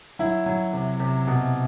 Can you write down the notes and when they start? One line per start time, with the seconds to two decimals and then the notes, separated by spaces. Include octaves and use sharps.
0.19 F#3 E4
0.46 F#3
0.73 C3
1.00 C3
1.27 B2